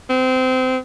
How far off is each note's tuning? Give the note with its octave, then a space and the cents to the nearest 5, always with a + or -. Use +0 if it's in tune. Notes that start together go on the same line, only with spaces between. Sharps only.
C4 -25